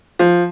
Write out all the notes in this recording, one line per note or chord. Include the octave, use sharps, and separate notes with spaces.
F3